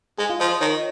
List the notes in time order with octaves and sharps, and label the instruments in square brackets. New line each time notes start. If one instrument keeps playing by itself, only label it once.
[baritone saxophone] G#3 [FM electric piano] G#4
[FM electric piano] F4
[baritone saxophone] F3 [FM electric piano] D#5
[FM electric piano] D#5
[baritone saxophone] D#3 [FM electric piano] C#5